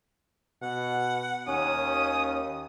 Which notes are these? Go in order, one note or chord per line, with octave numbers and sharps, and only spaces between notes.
B2 F#5
D#2 C#4 D#6